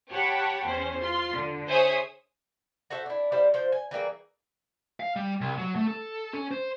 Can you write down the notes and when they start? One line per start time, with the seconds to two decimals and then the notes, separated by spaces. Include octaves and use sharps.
0.10 G4 C#5 F#5 G5 A5 B5
0.66 E2 C#4 C5
1.00 F4 C6
1.32 D3
1.68 G#4 C5 C#5 E5 D#6
2.90 F#4 A4 C5 E5
3.06 D4 E4
3.32 G3 E4 C5 F5
3.54 F3 C5
3.72 G#5
3.91 E3 G3 A#3 G#4
5.00 F5
5.16 G3
5.41 C2
5.58 F#3
5.76 A3
5.87 A4
6.33 C#4
6.51 C5